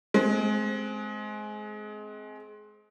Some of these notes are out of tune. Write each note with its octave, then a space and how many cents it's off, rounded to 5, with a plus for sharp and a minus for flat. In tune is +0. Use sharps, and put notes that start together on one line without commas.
G#3 +25 C4 +0